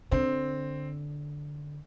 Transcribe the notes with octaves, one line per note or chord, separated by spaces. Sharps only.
D3 C4